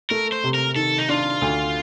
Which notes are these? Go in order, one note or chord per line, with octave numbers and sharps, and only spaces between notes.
A3 A#4
C5
C3
A#4
D#3 A4
D#4
D4 F4
D2